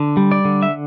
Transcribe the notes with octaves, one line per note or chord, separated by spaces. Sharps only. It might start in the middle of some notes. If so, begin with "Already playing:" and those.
Already playing: D3
G3
D5
D3
E5